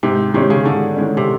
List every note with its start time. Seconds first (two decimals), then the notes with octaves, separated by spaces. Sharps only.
0.03 G#2 C3
0.34 C3 D#3 G#3 C#4
0.50 C#3
0.65 G#2 D3
0.96 D#3 G#3 C#4
1.17 C3